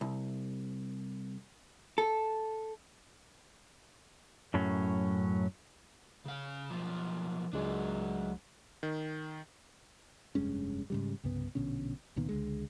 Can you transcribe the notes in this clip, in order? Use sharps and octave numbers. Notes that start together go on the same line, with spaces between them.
C2
A4
F#2 A2 F#3 C#4
C#3 F5
B1 F3
C#2 F#3 G#3 D4
D#3
F1 G2 G#3 C#4
G#2 C#3 G3
C2 G2 C#3 B3
A#1 B2 D3 C#4
C#2 A#2 D#3 B3
C#2 D3 G#3